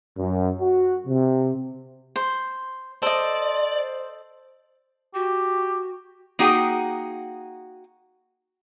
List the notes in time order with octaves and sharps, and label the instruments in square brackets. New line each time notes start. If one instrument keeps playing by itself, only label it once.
[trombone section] F#2
F#4
C3
[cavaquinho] C5
[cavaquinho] A4 D#5 [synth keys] C5 [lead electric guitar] D5
[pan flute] F#4 [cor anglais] G4
[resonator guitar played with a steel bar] A#3 D#4 F#4 G#4 G5